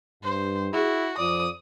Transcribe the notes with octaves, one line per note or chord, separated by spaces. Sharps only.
G2 C5
E4 F#4 G#4
F2 F3 D5 D#6